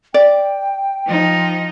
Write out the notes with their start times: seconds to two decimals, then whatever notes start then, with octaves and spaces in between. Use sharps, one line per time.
0.14 D5 G5
1.07 F3 D#4